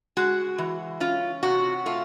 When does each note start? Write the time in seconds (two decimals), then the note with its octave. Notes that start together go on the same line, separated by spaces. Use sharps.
0.17 G#3 F#4
0.58 E3
1.00 C#4 F4
1.43 C3 F#4
1.86 A3 F4